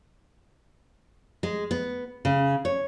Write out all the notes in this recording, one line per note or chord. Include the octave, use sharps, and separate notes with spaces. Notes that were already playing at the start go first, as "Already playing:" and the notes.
G#3
B3
C#3
C#5